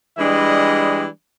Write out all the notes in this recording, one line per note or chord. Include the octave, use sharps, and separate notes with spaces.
E3 G3 G#3 D4 D#5